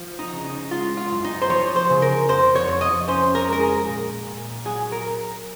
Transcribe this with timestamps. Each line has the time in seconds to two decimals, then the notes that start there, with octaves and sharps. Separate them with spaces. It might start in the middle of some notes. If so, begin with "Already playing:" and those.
Already playing: F3
0.19 D#4
0.33 C#3
0.45 D#4
0.71 G#3 F4
0.97 F4
1.11 F#2
1.25 D#4
1.42 C5
1.50 F3 C#5
1.76 C5
1.90 C#3
2.02 A#4
2.28 F2 C5
2.56 C#5
2.68 F2
2.81 D#5
3.08 C#4 C5
3.35 A#4
3.48 G#3 A#4
3.60 G#4
3.87 A#2
4.27 A#2
4.65 F#3 G#4
4.92 A#4